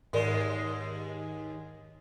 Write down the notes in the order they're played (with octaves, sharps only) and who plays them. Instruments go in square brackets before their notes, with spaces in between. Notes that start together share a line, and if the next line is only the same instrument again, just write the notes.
[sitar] D#2 G#3 [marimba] G#2 A#4 D5